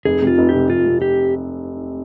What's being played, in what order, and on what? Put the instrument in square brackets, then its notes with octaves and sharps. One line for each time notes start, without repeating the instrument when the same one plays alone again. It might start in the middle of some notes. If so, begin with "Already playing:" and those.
[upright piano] F1 [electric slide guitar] G#4
[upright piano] C3
[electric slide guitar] F4
[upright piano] F1
[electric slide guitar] G4
[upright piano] C3
[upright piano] F1 [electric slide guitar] F4
[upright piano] C3
[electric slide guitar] G4